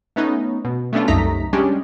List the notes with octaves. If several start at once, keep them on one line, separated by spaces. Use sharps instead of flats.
A3 B3 C#4 D#4
B2
A3 B3 C#4 D4 F4
C2 F#2 A3 D#4 A#5 B6
G3 G#3 C#4 D4 G4